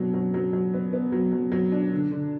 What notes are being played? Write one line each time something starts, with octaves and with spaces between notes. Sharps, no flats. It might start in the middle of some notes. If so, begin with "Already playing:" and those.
Already playing: B2 F#3 B3 D4
F#3
F#3
F#3
B3
B3
F#3
F#3
F#3
D4
D3
D3